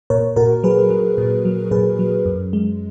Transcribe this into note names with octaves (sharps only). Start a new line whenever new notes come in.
A#2 A#4 C#5
A#2 F#4 A#4
F#3 G#4 B4
F#3
A#2
F#3
A#2 G#4 B4
F#3
F#2
G#3